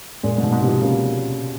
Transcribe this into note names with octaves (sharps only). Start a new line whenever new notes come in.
A#2 G#3
G#2
B2
G#2
C3
F3
C#3 A#3